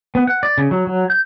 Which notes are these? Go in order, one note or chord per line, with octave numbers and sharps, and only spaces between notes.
B3
F#5
D5
C#3
F#3
F#3
G6